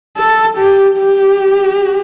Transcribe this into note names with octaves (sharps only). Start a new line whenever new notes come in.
A4
G4
G4